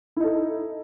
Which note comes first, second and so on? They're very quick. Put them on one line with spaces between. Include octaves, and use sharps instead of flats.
E4 D#4 A4